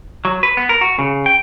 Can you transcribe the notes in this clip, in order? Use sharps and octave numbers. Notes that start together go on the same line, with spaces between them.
F#3
B4
B3
A#4
F#4
C#3
G5